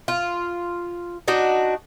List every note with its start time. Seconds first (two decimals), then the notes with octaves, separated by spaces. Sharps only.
0.08 F4
1.28 D4 D#4 F#4